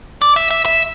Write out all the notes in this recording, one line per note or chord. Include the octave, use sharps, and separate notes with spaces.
D5
E5
E5
E5